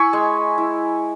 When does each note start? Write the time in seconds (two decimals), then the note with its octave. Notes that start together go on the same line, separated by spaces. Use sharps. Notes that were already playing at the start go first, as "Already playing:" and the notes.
Already playing: E4 G#5 B5 C#6 E6
0.13 G#3
0.58 E4